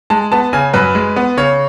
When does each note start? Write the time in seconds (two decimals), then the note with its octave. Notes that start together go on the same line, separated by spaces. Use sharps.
0.10 G#3 A5
0.32 B3 A5
0.53 C#3 G#5
0.73 F#2 B4
0.95 G#3
1.16 B3
1.37 C#3 C#5